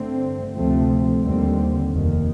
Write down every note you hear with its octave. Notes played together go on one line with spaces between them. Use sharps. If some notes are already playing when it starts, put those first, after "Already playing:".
Already playing: G2 D3 A3 C4
D2 C3 F3 A3 C4
D#2 D3 G3 C4
F1 D#2 D#3